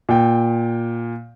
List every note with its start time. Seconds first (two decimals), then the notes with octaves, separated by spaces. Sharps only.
0.09 A#2 G5